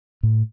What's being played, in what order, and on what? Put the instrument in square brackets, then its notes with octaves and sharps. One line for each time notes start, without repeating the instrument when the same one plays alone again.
[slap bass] A2